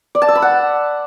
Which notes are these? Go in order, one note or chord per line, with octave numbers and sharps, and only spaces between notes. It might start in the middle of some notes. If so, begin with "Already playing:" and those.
D5
A5
E6
B5
F#5